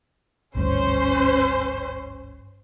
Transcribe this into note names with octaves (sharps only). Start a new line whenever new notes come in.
G#1 D2 G2 C#4 C5